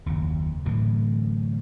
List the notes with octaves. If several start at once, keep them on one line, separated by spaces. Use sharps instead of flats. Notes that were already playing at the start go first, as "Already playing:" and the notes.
F#1 D#2
A2 D3 E3 F#3